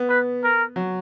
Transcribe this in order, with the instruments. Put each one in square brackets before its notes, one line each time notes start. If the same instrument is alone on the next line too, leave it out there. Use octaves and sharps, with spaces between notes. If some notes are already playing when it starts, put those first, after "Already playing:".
Already playing: [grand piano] B3
[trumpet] B4
A#4
[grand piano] F#3